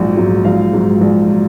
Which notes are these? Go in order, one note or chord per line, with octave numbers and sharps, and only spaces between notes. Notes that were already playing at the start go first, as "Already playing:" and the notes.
Already playing: A#1 G#2 F#3
G#2 F#3
A#1 F5
G#2 F#3
A#1
F#3